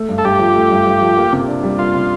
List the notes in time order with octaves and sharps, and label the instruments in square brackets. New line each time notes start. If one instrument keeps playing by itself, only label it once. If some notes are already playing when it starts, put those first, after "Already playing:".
Already playing: [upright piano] A3
G2
[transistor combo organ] A4
[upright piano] G2 [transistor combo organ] G4
[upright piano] F3
A3
G2
G2
F3
A#3
C3
D4
G3
[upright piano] A#3 [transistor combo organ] F4
[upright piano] C3